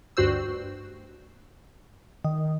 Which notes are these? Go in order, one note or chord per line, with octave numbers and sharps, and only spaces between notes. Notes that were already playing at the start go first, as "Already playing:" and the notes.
D2 G2 F#4 C5 E6
D#3